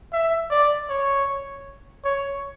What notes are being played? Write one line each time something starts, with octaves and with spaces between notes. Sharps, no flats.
E5
D5
C#5
C#5